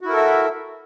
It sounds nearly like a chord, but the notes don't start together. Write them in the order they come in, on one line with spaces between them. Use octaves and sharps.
F#4 E4 A#4 A4 E5